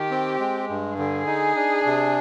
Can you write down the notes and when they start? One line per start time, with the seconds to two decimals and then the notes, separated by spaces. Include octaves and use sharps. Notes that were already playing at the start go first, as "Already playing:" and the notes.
Already playing: D#3 G4
0.11 C4
0.40 G#3
0.70 G2
0.98 D3 G#4
1.27 D#4
1.56 D4
1.86 C3